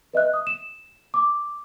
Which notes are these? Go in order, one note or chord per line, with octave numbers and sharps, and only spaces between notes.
B4 D#5 E5 F#6
D#6
E7
D6